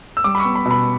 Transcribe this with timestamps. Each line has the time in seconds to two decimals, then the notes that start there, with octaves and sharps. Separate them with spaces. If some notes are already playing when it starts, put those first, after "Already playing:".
0.17 E6
0.24 G3 D6
0.35 B5
0.40 B3 C#6
0.55 B5
0.65 B2
0.71 B5